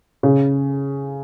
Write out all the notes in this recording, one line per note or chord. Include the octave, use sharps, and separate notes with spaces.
C#3